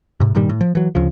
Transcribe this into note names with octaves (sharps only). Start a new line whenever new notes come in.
G#2 C3
G2 A#2 D#3 G3
A2
F3
E3 F#3
D2 C#3 F3